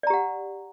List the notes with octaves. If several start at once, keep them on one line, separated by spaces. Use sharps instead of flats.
G4 D5 F#5 A#5